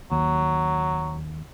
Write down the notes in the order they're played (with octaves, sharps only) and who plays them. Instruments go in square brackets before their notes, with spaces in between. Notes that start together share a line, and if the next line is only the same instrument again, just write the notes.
[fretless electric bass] D#2 [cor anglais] F#3